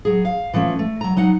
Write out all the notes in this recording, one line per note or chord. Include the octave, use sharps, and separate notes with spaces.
F#3 G#4
F5
E3 F3 A3 C#4
A3
F#3 A#5
F#3 D#4 F#5